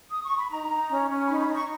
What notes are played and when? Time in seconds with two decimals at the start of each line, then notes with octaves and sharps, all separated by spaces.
0.10 D#6
0.23 C#6
0.37 B5
0.50 D#4 A#5
0.69 D#4
0.88 C#4
1.09 C#4
1.27 D#4 B5
1.40 B5
1.47 D#4
1.54 C#6